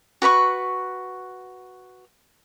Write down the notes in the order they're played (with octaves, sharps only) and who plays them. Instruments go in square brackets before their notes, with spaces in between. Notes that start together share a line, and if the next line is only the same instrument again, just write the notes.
[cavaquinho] F#4 B4 B5 C#6